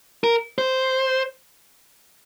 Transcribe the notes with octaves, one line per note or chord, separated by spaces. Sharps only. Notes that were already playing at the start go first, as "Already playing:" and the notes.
A#4
C5